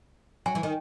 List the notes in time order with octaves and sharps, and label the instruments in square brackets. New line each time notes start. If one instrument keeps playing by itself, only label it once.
[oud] F#3 [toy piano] G#5
[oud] E3
D#3